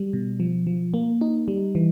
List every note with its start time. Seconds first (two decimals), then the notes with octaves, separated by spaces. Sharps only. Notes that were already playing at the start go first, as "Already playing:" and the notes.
Already playing: G3
0.13 B2
0.40 F3
0.67 F3
0.94 A#3
1.21 D#4
1.48 G3
1.75 E3